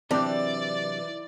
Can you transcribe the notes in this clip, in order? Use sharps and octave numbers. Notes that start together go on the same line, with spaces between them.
C3 E3 F#3 C4 D4 G4 D5